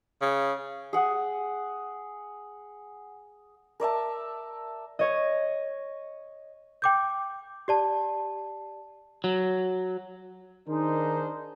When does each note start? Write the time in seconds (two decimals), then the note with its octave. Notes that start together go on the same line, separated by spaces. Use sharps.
0.21 C#3
0.93 G#4 F#5
3.80 A#4 D5 E5 A5
4.99 C#5 D#5
6.82 G5 D6 G6
7.68 G4 D5 A5
9.24 F#3
10.68 D#3 D4 D#4 G#4 A#4 C5